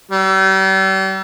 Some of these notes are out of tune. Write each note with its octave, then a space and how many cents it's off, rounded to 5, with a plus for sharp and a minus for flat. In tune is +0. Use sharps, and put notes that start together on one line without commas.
G3 -40